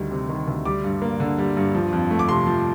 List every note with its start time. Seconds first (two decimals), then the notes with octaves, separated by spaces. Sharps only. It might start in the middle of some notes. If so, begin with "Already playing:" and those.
Already playing: D2 D#3 G3
0.11 C3
0.29 D#3
0.48 D2
0.65 G3 D6
0.84 G2
1.02 A#3
1.20 D3
1.38 G3
1.57 G2
1.75 F3
1.93 F2
2.11 A3
2.19 D6
2.29 C3 C6
2.47 F3